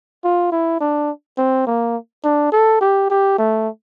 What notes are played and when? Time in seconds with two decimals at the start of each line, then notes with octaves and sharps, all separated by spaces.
0.24 F4
0.52 E4
0.81 D4
1.38 C4
1.67 A#3
2.24 D4
2.52 A4
2.81 G4
3.10 G4
3.38 A3